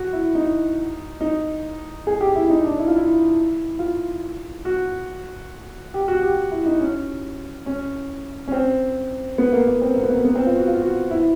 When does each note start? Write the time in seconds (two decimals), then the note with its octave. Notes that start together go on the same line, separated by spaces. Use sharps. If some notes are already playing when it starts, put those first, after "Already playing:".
Already playing: F#4
0.13 E4
0.35 D#4
1.21 D#4
2.07 G#4
2.21 G4
2.36 E4
2.50 D#4
2.64 D4
2.79 E4
2.88 F4
2.96 E4
3.79 F4
4.65 F#4
5.94 G4
6.08 F#4
6.23 G4
6.51 E4
6.66 D#4
6.81 C#4
7.66 C#4
8.48 C#4
8.52 C4
9.38 B3
9.53 A#3
9.67 A#3
9.82 C4
9.96 A#3
10.03 B3
10.10 A#3
10.25 B3
10.35 C4
10.46 F4
10.57 F#4
10.68 F4
10.82 F#4
11.11 E4